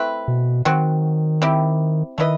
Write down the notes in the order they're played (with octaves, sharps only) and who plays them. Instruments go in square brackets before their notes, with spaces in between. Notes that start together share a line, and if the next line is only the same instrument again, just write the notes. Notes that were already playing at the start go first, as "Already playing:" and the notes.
Already playing: [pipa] A3 C4 E4 B4
[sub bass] B2
[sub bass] D#3 [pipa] F#3 C4 F#4
[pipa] C4 E4 G4
[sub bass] D#3 [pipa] A3 E4 B4 D#5